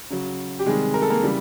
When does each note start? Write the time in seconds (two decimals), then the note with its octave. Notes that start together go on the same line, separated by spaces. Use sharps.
0.10 C#3 F#3
0.59 G4
0.66 C3 D#3 G3 G#3 G#4
0.94 A#4
1.02 A4
1.10 A#3 A#4
1.22 C#3 E3 G3